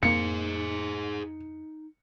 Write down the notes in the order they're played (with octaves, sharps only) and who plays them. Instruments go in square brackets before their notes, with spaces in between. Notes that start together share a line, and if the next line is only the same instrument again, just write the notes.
[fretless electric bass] F2 A#3 [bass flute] D#4 [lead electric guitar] G#4 C5 [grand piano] C#7